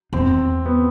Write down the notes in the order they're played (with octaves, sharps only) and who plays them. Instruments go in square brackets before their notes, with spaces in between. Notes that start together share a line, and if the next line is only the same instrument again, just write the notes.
[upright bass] E2 [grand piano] C4
[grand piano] B3